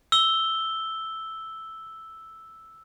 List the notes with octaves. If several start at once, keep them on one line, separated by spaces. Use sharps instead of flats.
E6 G7